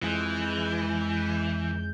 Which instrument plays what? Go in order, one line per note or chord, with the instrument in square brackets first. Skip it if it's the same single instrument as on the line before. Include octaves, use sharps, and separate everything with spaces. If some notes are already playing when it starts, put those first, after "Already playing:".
[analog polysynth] F2 G#3 G6 [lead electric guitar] E3